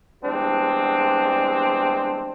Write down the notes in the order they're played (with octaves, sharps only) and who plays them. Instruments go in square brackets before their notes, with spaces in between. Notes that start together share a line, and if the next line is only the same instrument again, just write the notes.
[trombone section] E2 G3 G#3 C4 D4